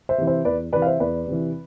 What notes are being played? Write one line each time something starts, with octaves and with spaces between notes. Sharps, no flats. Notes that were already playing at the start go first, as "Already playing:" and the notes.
C5 E5
C3 E3
C5 E5
E2 B4 D5
C3 E3 B4 D5
F5
C5 E5
E2 B4 D5
C3 E3